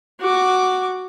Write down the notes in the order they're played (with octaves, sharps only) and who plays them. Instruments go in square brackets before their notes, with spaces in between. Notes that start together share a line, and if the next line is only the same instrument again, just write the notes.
[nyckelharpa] F#4 D6